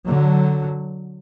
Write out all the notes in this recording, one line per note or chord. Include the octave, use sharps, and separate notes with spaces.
D3 F#3